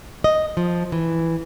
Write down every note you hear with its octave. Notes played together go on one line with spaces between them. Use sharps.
D#5
F3
E3